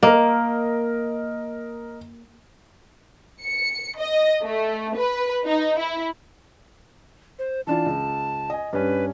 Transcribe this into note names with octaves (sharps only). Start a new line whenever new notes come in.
A#3 A#4 D#5
C#7
D#5
A3
B4
D#4
E4
C5
E3 D4 F4 A5
C#2
D#5 G#5
G2 C#4 B4